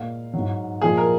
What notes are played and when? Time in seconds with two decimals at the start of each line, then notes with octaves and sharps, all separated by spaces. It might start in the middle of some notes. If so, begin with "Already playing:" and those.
Already playing: A#2 G#3 F5
0.34 G#2 F#3
0.81 A#2 F3 G#3 G#4
0.97 A#4